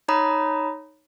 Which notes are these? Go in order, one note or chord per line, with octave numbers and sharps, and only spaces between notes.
D#4 C#5 A#5 B5 D#6